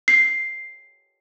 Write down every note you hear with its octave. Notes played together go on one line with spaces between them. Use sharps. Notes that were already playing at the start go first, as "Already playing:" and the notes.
C7